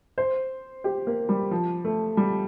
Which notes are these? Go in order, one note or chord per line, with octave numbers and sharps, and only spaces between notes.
C5
G4
A#3
G3
F3
A3
G3